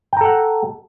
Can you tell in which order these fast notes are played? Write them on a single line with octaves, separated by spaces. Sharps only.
G5 A#5 A4 F#5